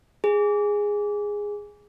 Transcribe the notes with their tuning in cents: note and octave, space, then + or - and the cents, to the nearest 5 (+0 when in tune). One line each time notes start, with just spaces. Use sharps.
G#4 -10